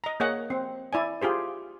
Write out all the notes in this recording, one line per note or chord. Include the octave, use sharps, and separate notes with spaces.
D#5 A#5
A#3 G#4 C#5 D#5 F#5
C4
E4 D5 G#5
F4 G4 G#4 C5